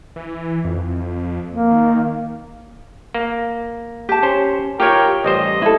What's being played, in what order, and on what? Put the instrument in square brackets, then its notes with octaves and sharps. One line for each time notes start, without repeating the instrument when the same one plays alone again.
[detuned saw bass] E3
F2
[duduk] A#3
[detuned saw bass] D#3
[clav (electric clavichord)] A#3
[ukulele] G4 A5
[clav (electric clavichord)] C#4 C5
[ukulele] F4 C#5 [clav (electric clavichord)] G4 [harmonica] A#4 G5
[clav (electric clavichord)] A1 G3 C5 [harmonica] D#5
[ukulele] E4 A4